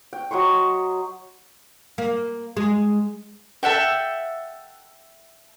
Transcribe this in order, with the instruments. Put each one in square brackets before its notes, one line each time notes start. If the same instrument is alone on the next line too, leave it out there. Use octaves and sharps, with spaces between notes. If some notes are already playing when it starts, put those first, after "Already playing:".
[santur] G5
F#3 D#5 C6 C#6
[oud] A#3
G#3
[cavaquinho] A4 E5 F#5 G5